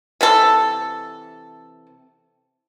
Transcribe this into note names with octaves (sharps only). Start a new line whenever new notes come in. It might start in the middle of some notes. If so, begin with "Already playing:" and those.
C3 E3 A4